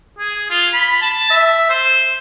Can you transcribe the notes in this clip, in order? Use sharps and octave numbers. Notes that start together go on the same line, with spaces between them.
G#4
F4
B5
A5
E5
C5